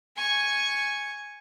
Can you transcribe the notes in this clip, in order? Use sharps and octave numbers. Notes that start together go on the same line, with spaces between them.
G#5 C#6